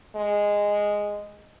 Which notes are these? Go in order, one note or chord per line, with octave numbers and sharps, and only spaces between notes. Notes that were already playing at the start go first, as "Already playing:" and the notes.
G#3